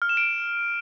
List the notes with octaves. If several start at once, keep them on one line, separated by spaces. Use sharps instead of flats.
F6
E7
D7